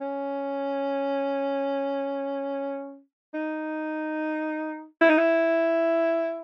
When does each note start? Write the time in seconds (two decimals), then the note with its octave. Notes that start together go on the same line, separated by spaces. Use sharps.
0.01 C#4
3.34 D#4
5.01 E4
5.09 D#4
5.18 E4